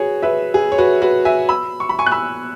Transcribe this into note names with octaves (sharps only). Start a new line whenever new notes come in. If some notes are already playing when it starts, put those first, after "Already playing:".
Already playing: F#4 G#4 B4 C#5
B4 E5
G#4
C#5
F#4 B4
F#4 B4
E5 G#5
B5 E6
C#6
B5
G#5 C#6
F#6
B5 E6